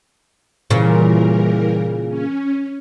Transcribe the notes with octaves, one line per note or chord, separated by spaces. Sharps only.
A#2 C#3 E3 G3 A#4
C#4